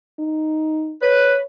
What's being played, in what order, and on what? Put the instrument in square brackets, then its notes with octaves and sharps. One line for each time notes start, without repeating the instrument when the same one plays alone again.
[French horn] D#4
[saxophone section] B4 [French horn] C#5